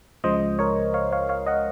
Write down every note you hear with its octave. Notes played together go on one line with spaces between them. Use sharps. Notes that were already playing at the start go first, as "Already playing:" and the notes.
C#2 C#3 F3 G#3 C5 D#5
A#4 C#5
C#5 F5
C#5 F5
C#5 F5
D#5 F#5